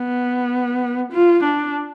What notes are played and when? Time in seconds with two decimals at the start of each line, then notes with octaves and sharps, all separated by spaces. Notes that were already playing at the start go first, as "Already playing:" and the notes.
Already playing: B3
1.12 F4
1.43 D4